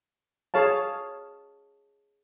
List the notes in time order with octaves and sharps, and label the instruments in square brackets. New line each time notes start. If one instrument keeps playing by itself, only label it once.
[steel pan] G#4 C#5 F5 A5